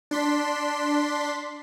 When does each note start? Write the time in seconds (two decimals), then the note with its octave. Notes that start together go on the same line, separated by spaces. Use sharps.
0.11 D4 C6 B6